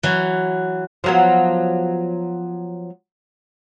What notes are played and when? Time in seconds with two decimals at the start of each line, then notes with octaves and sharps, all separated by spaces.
0.03 E3 F#3 F#4
1.04 F3 F#3 B3